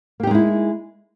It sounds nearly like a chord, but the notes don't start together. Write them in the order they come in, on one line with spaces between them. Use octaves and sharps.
A#3 G4 D#4 G#3 E4